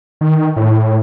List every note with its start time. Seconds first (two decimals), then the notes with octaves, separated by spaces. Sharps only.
0.21 D#3
0.56 A2